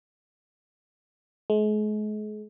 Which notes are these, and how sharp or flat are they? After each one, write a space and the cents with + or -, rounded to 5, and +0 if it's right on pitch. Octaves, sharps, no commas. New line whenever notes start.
G#3 +40